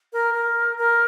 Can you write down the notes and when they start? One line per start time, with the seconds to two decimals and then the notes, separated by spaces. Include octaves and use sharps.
0.13 A#4
0.34 A#4
0.78 A#4